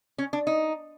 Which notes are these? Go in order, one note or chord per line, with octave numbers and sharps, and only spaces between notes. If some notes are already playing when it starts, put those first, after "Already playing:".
C#4
D4
D#4